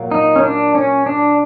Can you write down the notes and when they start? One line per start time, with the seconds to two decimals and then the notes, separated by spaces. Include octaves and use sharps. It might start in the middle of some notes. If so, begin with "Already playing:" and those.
Already playing: A#2 F#3 A#3
0.11 D#4
0.36 C#4
0.43 D4
0.75 C#4
1.06 D4